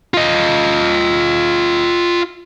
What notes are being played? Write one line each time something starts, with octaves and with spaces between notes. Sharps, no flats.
F4 D#5